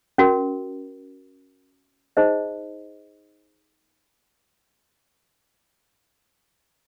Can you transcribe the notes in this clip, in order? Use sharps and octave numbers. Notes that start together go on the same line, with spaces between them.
C#4 F#4 A#4
D#4 G#4 C5 D#5